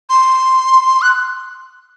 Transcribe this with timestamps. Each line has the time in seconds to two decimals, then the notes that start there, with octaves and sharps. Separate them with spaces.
0.10 C6
1.02 F#6